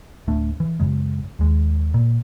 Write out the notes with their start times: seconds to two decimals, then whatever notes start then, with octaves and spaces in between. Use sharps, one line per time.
0.28 D1 A3 D4
0.60 E3
0.80 F#2 C#3 G#3
1.39 D#2 G#3
1.94 A#2